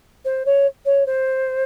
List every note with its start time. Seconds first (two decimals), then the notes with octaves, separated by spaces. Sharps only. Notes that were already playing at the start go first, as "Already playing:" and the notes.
0.25 C5
0.46 C#5
0.85 C#5
1.06 C5